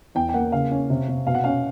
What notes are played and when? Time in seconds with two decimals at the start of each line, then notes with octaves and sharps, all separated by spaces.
0.15 E2 G5
0.29 G5
0.34 A#3 F#5
0.52 C#3 F5
0.71 C#4
0.90 C3
1.08 C3
1.27 B2 F5
1.35 F#5
1.44 C#4 F5